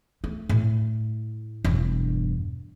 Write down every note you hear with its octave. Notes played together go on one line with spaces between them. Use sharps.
A3
A2
E1 G2